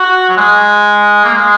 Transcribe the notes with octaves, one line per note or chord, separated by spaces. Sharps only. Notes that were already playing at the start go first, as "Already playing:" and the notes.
Already playing: F#4
F#3
G#3
A#3
G#3